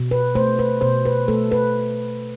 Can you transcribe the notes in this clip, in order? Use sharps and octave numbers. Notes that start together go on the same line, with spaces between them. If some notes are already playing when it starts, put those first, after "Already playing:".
Already playing: B2
B4
A3 C5
B4
B2 C5
B4
A3 A4
B4